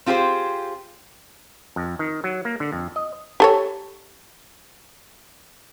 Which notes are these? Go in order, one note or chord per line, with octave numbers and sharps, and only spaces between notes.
C4 F4 G4 G#4 C5
F2
D#3
F#3
A#3
D3
F2
D#5
G4 A4 C#5